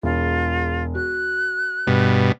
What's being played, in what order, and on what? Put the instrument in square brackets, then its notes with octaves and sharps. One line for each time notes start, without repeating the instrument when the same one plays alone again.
[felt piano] E1 G#4 [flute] F4
[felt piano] F#4 [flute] F#6
[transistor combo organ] G2 B2